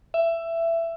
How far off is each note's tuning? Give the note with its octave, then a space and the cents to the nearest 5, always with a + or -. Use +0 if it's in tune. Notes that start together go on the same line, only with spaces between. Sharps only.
E5 +15